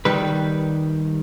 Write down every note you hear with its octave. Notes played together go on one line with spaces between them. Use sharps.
D#3 G3 B4